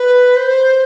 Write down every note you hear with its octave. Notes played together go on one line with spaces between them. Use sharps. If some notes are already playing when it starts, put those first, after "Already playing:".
Already playing: B4
C5